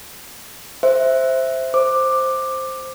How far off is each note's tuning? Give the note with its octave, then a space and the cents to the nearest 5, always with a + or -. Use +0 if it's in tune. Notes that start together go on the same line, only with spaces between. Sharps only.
C5 +0 E5 +0
C5 +0 D6 +10